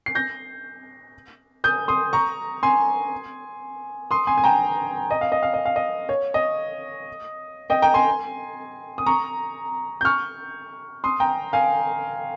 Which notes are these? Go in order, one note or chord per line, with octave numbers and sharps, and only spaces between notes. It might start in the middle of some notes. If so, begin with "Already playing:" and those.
C7
G6 A#6
D#6 G6
C6 D#6
A#5 C#6
G#5 C6
C6 D#6
G#5 C6
G#5
G5 A#5
D#5
F5
D#5
F5
D#5
F5
D#5
C#5
D#5
D#5 G5
G5 A#5
G#5 C6
D#6
A#5 C#6
G6
C#6 F6
C6 D#6
G5 A#5
F5 G#5